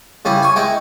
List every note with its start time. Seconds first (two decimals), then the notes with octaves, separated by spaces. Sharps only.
0.25 C#3 G3 E4
0.42 G#5 C#6
0.56 G#3 E4 G5